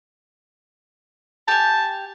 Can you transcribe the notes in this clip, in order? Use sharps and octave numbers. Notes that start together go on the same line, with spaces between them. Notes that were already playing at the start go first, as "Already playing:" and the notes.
G4 G#5 A5